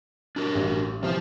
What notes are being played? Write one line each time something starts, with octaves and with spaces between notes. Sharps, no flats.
D4 F#4 A#4
A1
C3 E3 F3 C5 F5